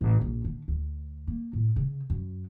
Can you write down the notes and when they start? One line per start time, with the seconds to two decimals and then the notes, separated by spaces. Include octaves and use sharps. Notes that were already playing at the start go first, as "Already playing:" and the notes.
0.01 A1
0.21 A#1
0.44 D3
0.68 D2
1.27 A#3
1.53 A2
1.76 C#3
2.10 F#2